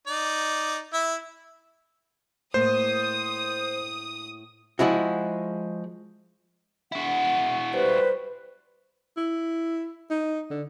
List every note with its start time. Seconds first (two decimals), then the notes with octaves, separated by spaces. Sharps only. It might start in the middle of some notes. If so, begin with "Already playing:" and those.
0.07 D#4 D5
0.93 E4 E5
2.54 A2 A#3 C5 D#6
4.79 F3 G#3 E4 F#4
6.92 E4 F#4 F#5
7.74 G3 G4 B4 C5
9.17 E4
10.10 D#4
10.51 D3